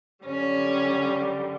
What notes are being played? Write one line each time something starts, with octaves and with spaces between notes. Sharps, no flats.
F#2 D3 G3 C#4